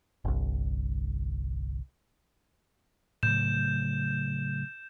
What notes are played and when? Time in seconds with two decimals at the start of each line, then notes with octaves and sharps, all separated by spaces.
0.25 G1 C2
3.23 A2 C#3 F#3 G6 E7